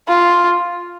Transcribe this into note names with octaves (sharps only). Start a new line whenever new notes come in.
F4